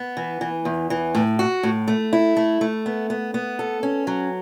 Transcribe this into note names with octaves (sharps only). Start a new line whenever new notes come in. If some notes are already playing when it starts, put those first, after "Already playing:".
Already playing: B3
E3
E3
E2
E3
A2
F#4
A2
A3
E4
A3
A3
B3
B3
B3
A4
C#4
F#3